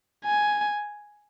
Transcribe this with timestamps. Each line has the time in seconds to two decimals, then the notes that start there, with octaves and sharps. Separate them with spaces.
0.24 G#5